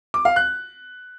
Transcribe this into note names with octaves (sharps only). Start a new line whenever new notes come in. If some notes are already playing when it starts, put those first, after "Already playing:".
D6
F5
F#6